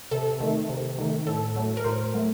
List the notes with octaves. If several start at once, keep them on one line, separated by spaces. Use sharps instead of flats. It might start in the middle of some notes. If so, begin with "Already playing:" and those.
C3 A4
D#3 A3
C3
D#3 A3
A2 A4
F#3 A3
A#4
A2 C5
F#3 A3